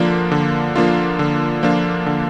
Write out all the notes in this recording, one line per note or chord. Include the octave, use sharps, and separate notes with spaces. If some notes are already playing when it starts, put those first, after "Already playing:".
Already playing: D3 F3 A#3 D4 F4
D3
F3 A#3 D4 F4
D3
F3 A#3 D4 F4
D3